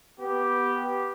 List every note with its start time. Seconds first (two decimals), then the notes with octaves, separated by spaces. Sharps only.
0.20 B3 G4